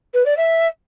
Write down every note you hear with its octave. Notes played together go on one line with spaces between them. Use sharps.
B4
D5
E5